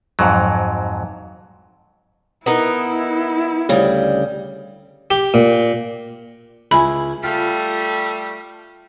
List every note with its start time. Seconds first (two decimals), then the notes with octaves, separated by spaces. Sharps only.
0.19 F2 G#2 F#3
2.46 B3 D#4 E4 A#4
3.69 D2 C#3 G3
5.11 G4
5.34 A#2
6.71 C#2 E4 G#5 B5
7.23 G3 A3 F4